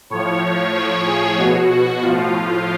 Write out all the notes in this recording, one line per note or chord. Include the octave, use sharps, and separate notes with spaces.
A2 F3 C#5
C#5
A2 F3 C#5
G#4
B2 F#4
F#4
A2 F3 F4
F4